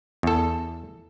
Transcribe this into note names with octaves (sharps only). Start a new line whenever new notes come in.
E2 A4